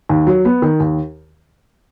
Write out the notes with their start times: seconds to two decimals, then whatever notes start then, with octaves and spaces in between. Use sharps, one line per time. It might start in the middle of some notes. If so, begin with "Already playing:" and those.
0.09 D#2
0.27 F#3
0.45 B3
0.62 D#3
0.80 D#2